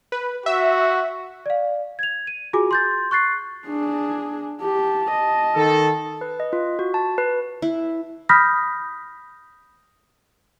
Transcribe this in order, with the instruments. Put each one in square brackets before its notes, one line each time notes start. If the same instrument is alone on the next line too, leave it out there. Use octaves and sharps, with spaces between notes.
[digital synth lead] B4
[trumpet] F#4 [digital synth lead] E5
[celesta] D5 F5
G#6 F7
D#7
F4 F#4 G#4 G#5 D6
C6 G6 A6
C#6 F#6 A6 C7
[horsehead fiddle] D4 G#4
[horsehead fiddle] G4 [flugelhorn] A5
[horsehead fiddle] D#5
[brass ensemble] D#3 A4
[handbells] B4
D#5
F4
F#4
A5
B4
[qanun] E4
[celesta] B5 D#6 F6 G6 A#6 B6